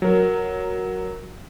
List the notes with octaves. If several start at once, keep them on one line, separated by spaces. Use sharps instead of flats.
F#3 A#4